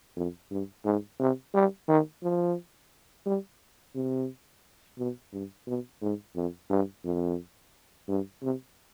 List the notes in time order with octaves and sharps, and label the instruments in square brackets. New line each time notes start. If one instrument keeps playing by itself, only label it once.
[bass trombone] F2
G2
G#2
C3
G3
D#3
F3
G3
C3
B2
G2
B2
G#2
F2
G2
F2
G2
C3